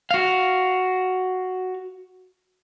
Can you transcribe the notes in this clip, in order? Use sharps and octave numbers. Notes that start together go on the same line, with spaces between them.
F#4 F5